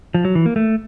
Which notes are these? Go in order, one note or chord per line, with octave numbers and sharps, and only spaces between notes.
F3
F#3
E3
A#3
A3